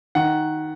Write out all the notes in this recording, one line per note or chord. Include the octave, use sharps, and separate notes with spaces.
D#3 F#5